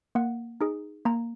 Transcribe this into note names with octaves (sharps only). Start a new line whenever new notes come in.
A#3 F#5
D#4 G#4
A#3 A#5